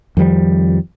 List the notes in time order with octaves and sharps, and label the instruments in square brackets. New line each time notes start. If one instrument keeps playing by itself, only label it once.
[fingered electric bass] F2 D#3 F3 G3